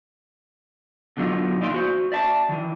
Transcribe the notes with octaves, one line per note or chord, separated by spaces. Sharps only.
B2 D3 F#3 D#4 F4
A#2 E3 D#4 D5 F5 C6
F#4 C5
D5 E5 A5
D#3 E3